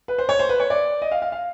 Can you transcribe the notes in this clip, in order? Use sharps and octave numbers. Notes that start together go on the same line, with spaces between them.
B4
C5
C#5
C5
B4
C#5
D5
D#5
F5
F5
F5